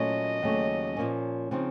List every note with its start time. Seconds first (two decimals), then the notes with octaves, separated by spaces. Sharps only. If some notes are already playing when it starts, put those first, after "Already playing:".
Already playing: A#2 F#3 A3 C#4 D#5
0.42 D#2 C#3 F#3 A3 C#4
0.96 A#2 F3 A#3 C#4
1.51 C#3 F3 C4 D#4